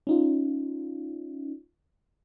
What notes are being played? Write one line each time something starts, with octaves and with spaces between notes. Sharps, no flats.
C#4 D#4 F4